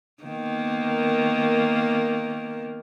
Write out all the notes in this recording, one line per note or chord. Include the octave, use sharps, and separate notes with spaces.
D#3 A#3 B3